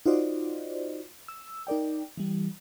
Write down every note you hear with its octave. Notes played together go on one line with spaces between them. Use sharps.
D#4 F4 F#4 C5 D5 D#5
E6
D#4 A#4 D5 G5
E3 G3